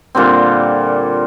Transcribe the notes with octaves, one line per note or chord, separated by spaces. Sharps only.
A#2 D3 G3 C4